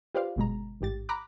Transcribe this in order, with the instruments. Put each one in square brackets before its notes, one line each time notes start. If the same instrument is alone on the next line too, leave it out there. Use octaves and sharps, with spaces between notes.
[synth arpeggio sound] F4 G4 B4 C5 D5 F5
G1 B2 G#3 A#5
A1 G#2 G4 A6
A#5 B5 D6 F#6